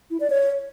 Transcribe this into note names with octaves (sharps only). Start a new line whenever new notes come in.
E4
D5
C#5